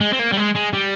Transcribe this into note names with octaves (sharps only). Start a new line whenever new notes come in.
G#3
C4
A#3
G3
G#3
G#3
G3